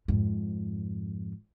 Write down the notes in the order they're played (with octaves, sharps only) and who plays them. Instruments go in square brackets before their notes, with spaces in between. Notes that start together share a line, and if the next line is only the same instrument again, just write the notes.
[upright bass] F2 G#2